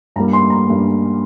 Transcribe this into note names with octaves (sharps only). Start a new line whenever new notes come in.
G2 G3 A#3 A#5
C6
A#5
G2 G3 A#3